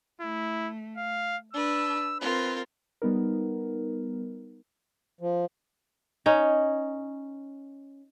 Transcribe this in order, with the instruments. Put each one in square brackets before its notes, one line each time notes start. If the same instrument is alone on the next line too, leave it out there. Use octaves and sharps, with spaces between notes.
[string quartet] A3 [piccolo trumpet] E4
[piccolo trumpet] F5
[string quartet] D4 B4 [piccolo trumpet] E6
[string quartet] C4 F4 A#4 [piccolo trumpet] B4
[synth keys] G3 B3 D#4 A#4
[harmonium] F3
[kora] C#4 D#4